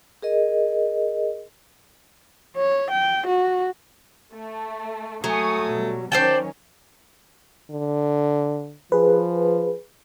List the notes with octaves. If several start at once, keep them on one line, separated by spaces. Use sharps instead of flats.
G#4 A#4 D#5
C#5
G5
F#4
A3
F#3 A3 G#5 C#6 D#6
B2 G3
D#3 F#3 C#4 C5 D5 G5 A5
D3
F3 G#4 B4